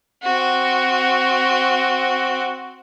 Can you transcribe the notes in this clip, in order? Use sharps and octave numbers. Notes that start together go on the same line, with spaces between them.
C4 F#4